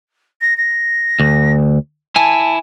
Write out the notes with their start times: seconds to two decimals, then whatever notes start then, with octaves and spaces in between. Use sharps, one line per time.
0.41 A#6
0.57 A#6
1.20 D2
2.16 E4 G#5 A5